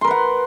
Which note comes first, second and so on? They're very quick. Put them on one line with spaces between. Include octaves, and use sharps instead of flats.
C6 A#4 B4 F#5